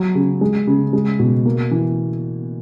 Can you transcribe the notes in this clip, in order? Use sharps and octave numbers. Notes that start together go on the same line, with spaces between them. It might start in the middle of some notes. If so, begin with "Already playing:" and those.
Already playing: F#3
C#3
G#3
C#3
G#3
B2
A#3
E3